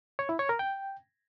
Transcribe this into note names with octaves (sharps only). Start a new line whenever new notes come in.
C#5
E4
C#5
A#4
G5